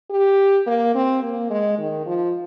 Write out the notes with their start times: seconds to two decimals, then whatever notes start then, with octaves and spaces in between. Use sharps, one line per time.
0.11 G4
0.66 A#3
0.95 C4
1.23 A#3
1.50 G#3
1.78 D#3
2.06 F3